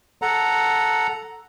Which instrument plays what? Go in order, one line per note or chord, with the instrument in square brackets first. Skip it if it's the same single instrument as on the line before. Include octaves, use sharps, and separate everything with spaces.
[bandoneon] A4 F#5 A#5